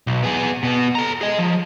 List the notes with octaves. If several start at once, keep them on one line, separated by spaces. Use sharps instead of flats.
B1
B3 G#4
B2 B3
A4 A#5
G#4 D#5
F3